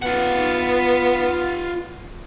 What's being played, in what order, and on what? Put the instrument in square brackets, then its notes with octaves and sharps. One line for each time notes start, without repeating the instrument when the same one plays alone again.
[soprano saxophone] B3 [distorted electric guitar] F4 F#5